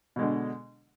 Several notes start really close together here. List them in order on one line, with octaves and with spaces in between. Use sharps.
B2 G#3 D3